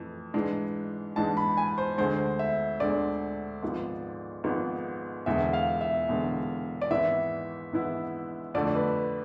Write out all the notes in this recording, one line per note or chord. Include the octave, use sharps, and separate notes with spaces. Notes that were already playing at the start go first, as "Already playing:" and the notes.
Already playing: F2 E3 A3
G#2 E3 G#3 D4
G#2 E3 G#3 D4 A5
B5
G#5
C5
D2 D3 G#3 C5
E5
D2 D3 G#3 D5
G#1 G#2 F3 B3
G#1 G#2 F3 B3
E1 E2 D3 G#3 E5
F5
E5
E1 E2 D3 G#3
D5
G#1 G#2 E3 B3 E4 E5
G#1 G#2 E3 B3 E4
F2 D3 A3 D5
B4